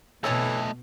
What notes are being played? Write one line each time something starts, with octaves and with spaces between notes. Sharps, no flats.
B2 E3 A3 A4 C#5 D#5 A5